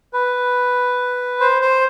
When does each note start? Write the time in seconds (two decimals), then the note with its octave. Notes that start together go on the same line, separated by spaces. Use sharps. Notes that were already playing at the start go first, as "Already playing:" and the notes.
0.13 B4
1.40 C5
1.62 C5